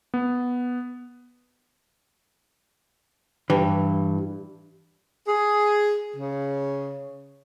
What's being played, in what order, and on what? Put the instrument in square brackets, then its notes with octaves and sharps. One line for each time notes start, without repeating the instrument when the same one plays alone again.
[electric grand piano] B3
[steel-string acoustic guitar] G2 [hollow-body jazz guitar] E3
[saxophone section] G#4
C#3